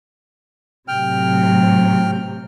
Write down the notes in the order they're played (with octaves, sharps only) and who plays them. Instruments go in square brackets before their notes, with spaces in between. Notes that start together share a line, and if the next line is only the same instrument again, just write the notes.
[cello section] A2 C3 F#3 [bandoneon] G5 F6